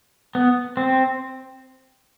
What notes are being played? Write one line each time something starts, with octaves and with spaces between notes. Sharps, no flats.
B3
C4